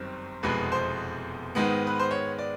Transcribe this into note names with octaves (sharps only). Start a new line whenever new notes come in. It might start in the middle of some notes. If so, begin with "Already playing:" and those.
Already playing: G1 F#2 D#3 G3 C4
F1 E2 B2 G#3 B4
C5
G#2 D#3 G#3 B3
B4
C5
C#5
D5